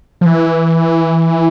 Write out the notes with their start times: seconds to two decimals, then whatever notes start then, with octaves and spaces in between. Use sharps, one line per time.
0.21 F3
0.26 E3